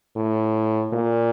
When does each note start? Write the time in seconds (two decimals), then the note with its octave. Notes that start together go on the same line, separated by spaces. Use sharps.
0.16 A2
0.93 A#2